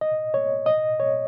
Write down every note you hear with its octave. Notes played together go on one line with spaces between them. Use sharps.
D#5
C#5
D#5
C#5